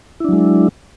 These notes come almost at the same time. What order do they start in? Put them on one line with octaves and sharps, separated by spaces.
E4 D4 F#3 G#3